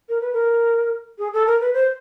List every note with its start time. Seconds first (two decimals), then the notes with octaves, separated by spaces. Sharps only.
0.09 A#4
0.20 B4
0.33 A#4
1.18 G#4
1.33 A4
1.46 A#4
1.60 B4
1.73 C5